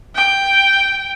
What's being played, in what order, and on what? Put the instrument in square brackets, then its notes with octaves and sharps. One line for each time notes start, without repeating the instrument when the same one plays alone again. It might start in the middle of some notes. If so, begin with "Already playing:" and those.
[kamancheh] G5